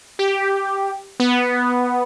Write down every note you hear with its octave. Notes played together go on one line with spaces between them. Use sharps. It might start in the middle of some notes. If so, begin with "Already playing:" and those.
G4
B3